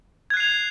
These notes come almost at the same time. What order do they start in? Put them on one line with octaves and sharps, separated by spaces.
G#6 F#6 C7 F7